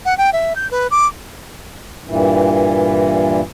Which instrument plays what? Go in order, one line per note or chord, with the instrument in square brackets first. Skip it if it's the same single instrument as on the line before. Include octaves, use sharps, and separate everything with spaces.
[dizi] F#5
G5
E5
G6
B4
D6
[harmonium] G2 A#2 E3